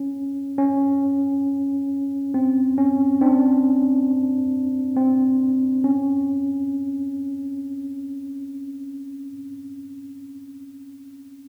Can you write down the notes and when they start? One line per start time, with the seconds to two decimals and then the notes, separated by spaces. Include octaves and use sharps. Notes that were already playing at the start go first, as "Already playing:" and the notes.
Already playing: C#4
0.58 C#4
2.34 C4
2.78 C#4
3.21 C4 D4
4.97 C4
5.84 C#4